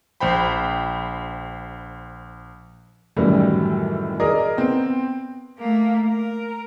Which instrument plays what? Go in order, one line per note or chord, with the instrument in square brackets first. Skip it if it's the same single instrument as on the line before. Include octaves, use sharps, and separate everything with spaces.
[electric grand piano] A#1 C5 G5 B5
[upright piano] F#2 A2 D#3 E3 F#3 G3
G#4 A#4 D5 D#5
B3 C4 G5
[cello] A3 A#3
A#4